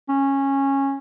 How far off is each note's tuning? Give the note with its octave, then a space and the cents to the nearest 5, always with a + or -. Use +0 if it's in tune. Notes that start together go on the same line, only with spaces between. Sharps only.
C#4 -15